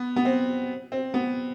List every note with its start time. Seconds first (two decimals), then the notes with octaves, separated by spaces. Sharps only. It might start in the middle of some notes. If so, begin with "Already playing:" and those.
Already playing: B3
0.16 B3
0.25 C4
0.92 C4
1.14 B3